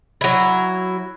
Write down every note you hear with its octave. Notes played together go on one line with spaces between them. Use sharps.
F#3 E4